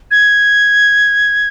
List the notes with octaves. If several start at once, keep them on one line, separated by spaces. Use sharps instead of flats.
G#6